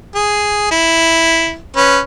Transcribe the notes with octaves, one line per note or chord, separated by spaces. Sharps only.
G#4
E4
C#4 B4